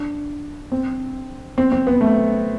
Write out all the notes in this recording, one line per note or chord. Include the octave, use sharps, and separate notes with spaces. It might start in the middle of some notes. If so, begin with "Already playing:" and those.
Already playing: D4
C4
C4
C4
B3
A3